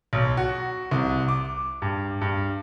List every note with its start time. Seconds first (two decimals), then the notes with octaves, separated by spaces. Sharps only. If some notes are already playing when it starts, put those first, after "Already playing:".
0.13 B1
0.37 F#4
0.91 C2
1.28 D6
1.82 G2
2.21 G2